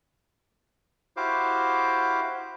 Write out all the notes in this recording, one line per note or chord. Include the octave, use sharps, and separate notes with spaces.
E4 F#4 G4 C5 F5 D6